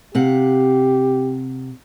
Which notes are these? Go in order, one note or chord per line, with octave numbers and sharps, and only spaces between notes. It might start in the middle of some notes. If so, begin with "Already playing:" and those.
C3 G4 F5 F#5